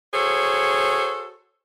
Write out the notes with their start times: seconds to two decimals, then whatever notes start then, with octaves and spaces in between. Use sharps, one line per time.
0.13 F#4 G#4 A4 C5 C#5